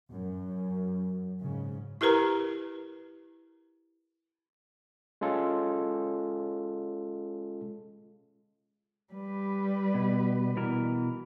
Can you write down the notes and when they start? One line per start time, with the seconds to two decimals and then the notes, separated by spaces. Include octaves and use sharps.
0.12 F#2
1.40 G#2 C#3
2.01 E4 G4 A#4 B4 A#5
5.21 G#3 C#4 F4 A4
9.14 G3 B4
9.94 B2
10.57 B2 E3 A#4